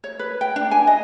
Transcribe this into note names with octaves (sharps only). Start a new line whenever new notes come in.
C#5
B4
G5
D4
G#5
D#5